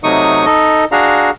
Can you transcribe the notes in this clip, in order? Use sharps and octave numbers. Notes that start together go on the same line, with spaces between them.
C3 F#3 A3 D#4 C#6 D#6
D#4 A4 D#5
D4 F#4 G#4 F5 A#5